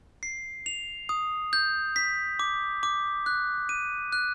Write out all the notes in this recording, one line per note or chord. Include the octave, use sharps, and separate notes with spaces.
C7
F7
D#6
G6
B6
D6
D6
F#6
D#7
F#6